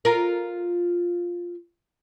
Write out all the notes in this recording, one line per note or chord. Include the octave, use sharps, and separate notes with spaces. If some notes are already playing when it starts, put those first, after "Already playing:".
F4 A#4